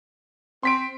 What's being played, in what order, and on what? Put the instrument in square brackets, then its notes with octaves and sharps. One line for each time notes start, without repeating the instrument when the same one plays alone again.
[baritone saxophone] C4 [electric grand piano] C6 B6 D7